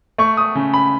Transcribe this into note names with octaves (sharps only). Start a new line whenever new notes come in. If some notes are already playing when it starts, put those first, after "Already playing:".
A3 C#6
D#6
C#3
B5